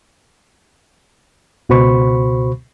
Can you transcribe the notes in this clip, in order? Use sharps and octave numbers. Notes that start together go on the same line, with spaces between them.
C#2 B2 F#4 C5 B5 C#6